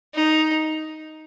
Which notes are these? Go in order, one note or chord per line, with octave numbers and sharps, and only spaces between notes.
D#4